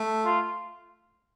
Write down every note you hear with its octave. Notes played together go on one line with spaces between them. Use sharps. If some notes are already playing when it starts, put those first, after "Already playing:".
Already playing: A3
F4